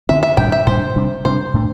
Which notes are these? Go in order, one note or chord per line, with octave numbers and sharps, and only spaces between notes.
D3 C4 E5
E5
A2 G3 D4 G5
E5
A2 G3 D4 C5
C3 G3 D4
C3 G3 D4 C5
A2 A3 D4